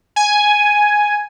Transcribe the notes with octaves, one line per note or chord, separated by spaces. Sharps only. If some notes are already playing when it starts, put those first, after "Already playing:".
G#5